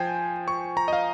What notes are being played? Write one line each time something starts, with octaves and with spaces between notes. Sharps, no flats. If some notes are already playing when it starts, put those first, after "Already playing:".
Already playing: F3 C5 G5 G#5
C#6
A#5
D#5
F5